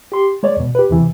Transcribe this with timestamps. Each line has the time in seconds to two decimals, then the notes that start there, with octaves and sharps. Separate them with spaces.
0.12 G4 C6
0.43 G#3 C#5 D5
0.57 E2 B2
0.75 G4 B4
0.90 E2 C3 E3